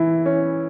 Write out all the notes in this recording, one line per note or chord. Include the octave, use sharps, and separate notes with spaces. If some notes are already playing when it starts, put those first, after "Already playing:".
Already playing: E3 E4
C#4